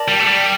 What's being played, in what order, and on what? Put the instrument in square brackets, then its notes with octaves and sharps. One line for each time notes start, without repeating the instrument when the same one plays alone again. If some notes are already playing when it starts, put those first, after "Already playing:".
Already playing: [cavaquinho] A#4 D5 A5
[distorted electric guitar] G3
A3
G3